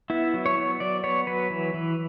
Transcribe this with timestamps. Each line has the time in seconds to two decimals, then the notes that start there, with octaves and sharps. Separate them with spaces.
0.10 B3 E4
0.34 F#3
0.46 C#5
0.57 B3
0.80 F#3 D5
1.04 B3 C#5
1.27 F#3 B4
1.50 E3
1.74 E3